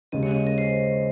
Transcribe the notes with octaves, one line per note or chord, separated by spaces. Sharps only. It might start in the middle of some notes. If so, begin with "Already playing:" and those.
D#2 C#3 G#3 D#5
C#5
D#5
A#4
C5